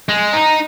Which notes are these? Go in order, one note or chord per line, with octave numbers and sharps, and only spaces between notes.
G#3
D#4